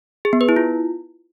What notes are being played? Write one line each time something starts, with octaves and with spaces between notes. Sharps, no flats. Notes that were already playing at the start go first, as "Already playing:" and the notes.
G#4
B3
B4
E4
F4